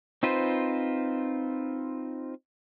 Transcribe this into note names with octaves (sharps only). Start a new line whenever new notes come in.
C4 D#4 F4 B4 C5